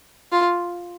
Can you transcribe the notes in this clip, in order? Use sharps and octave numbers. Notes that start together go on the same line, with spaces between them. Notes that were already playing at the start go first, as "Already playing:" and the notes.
F4